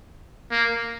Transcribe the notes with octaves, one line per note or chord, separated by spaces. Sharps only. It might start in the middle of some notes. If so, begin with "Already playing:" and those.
A#3